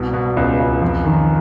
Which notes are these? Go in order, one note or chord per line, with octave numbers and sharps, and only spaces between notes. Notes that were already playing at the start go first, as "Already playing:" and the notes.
Already playing: C2 B2
B2
C#2
C#2
F2
D#3